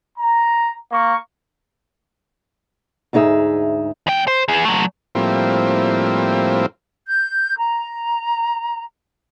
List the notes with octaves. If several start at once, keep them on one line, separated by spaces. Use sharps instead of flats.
A#5
A#3 C#6
D2 G#2 D#4 G#4 E5
E2 G5
C5
E2 G#4
F#3 A3
A2 F3 G3 A#3 C4 E4
G6
A#5